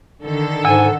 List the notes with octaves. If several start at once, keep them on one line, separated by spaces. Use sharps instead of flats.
D3 D#3 A4
G#2 F#5 G#5 E6